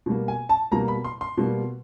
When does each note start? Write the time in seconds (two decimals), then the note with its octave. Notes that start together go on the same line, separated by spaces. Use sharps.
0.06 B2 G3 A#3
0.28 G#5
0.49 A5
0.71 B2 G3 A#3 A#5
0.88 B5
1.05 C6
1.21 C6
1.37 B2 G3 A#3